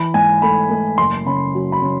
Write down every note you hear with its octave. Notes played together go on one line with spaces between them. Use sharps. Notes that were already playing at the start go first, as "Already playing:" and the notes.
Already playing: E3 B5
G#2 G#5
A3 B5
A3
F#1 C6
C#3 B5
F#3
B5
C#3